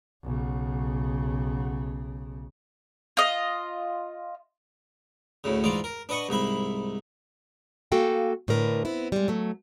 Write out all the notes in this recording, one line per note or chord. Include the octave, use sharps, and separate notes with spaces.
B1 C#3
F4 D#5
D2 A2 C#3
G#2 E3 F4 D5
A#4
D4 B4 D#5 F#5 C#6
C2 G#2 E5 B5
A#3 F#4 A4 F5 G5 G#5
A2 D3 A#4 B4
B3 C4 E4
G3 G#3
F#3 A3